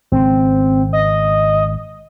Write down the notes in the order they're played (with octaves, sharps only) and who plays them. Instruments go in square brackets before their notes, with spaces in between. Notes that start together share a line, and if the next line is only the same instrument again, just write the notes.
[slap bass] G#1 C#3 [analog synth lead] C4
[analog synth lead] D#5